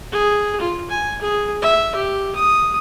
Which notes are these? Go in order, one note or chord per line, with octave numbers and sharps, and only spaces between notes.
G#4
F4
G#5
G#4
E5
G4
D#6